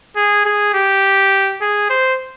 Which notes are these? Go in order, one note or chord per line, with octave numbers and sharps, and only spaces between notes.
G#4
G#4
G4
G#4
C5